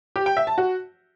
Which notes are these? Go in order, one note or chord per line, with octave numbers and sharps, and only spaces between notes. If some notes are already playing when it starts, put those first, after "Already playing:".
G4
G5
E5
A5
F#4